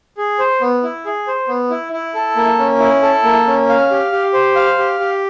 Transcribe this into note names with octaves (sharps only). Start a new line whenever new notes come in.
G#4
C5
B3
E4
G#4
C5
B3
E4
E4
A4
A#3
C#4
E4
A4
A#3
C#4
F5
G4
G4
C5
F5
G4
G4